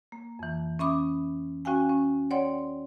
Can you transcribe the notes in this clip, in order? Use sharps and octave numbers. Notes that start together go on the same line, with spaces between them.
A#3
F2 E3
C#4 E5 B5 D6 D#6
C#4 F#4 F5 G5 G#5
C#4
C#5 D5 F#5 G5 C6